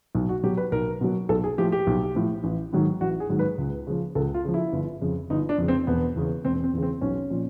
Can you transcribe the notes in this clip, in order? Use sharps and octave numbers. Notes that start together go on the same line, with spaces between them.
B1
F#4
B2 F#3 G4
B4
B1 A#4
B2 F#3
B1 A4
G#4
A2 F3 G4
G4
B1
A2 F3
A1
G#2 D#3 F#3
A1 F#4
G#4
G#2 D#3 F#3
B4
C#2
C#3 F3
C#2 A4
F4
C#3 F3
E4
G1
F2 C#3
G1 D#4
D4
F2 C#3
C4
E1 B3
E2 C#3
E1 C4
C4
E2 C#3
C4
B1 C#4
A#2 F3